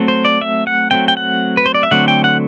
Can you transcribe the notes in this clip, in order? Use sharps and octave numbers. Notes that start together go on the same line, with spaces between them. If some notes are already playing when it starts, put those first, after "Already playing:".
Already playing: F#3 A3 C4
C5
D5
E5
F#5
F#3 A3 C4 G5
G5
F#5
B4
C5
D5
E5
D3 F#3 A3 C4 F#5
G5
F#5